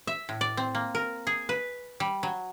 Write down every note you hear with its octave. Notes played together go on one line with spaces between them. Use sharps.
E5
A2
D5
C4
A#3
A#4
G#4
B4
G3
F#3